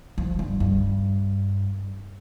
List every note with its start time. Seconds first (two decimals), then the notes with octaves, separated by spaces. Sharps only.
0.18 F3
0.39 G2
0.60 G2